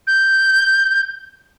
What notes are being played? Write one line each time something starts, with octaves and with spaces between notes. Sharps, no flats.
G6